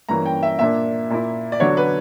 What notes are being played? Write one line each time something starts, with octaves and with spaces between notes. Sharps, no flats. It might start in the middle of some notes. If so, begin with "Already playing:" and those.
G2 E3 A#3 C#4 A#5
G5
E5
A#2 A#3 D4 E5
A#2 A#3 E4
D5
D3 F#3 B3 D4 C#5
B4